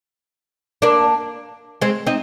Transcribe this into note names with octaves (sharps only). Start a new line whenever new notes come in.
A#3 D4
G#3 C4
C4 D#4